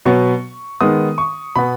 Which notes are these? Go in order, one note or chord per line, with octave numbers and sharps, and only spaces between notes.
B2 F#3 B3 C#6
D#3 G#3 B3 D#6
C#6
B2 B3 B5